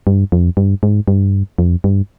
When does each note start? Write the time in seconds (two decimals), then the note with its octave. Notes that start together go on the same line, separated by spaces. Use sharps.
0.07 G2
0.32 F2
0.57 G2
0.83 G#2
1.08 G2
1.58 F2
1.84 G2